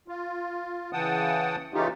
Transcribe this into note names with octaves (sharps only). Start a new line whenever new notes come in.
F4
C#3 E3 F#5 G5 A5 D#6
C#3 E3 A3 D#4 F4 G4